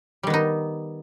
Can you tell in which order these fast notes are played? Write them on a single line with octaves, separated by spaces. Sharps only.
G3 D#3 B3 D#4